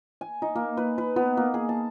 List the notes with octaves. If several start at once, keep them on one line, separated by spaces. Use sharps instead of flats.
G#5
D#4
A#3
B4
B4
B3
A#3
G#4
A5